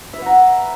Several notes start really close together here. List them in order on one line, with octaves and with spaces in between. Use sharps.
E5 B4 F#5 A#5